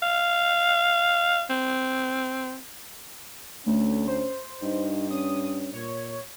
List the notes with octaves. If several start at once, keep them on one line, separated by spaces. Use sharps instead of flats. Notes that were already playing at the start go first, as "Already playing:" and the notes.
F5
C4
D2 A3 C#4
C5
G2 D#4
C#4 D#6
A#2 C#5